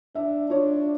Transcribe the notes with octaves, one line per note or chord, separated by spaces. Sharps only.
D4 E5
D4 F4 C#5